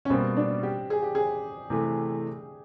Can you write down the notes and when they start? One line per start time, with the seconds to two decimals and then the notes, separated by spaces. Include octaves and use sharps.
0.05 C#4
0.10 B2 G3 A#3 C4
0.37 D4
0.63 G4
0.90 G#4
1.03 G4
1.15 G#4
1.70 C3 E3 A3